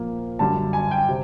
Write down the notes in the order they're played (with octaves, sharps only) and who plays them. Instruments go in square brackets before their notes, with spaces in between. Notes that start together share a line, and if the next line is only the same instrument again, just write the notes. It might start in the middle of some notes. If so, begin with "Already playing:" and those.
Already playing: [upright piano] A#2 F3 A#3
F#2 D3 G3 A5
G#5
G5
C3